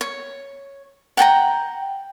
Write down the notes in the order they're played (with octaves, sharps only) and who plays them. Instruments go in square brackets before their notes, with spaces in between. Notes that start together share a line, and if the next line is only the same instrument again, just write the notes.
[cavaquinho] C#5
F#5 G5 A5 A#5